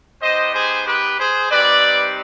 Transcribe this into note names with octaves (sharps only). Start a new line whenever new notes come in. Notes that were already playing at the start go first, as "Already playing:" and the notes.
B3 D#4 G4 C5 D#5
G#4 C5
G4 B4
G#4 C5
G3 C4 D#4 G4 B4 D5